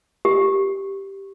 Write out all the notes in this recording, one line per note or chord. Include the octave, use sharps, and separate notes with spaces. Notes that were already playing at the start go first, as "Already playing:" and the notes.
G4